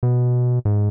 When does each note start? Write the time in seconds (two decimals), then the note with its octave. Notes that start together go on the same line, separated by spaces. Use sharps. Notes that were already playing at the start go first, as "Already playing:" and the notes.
0.03 B2
0.65 G#2